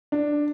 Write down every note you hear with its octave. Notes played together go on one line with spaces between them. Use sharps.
D4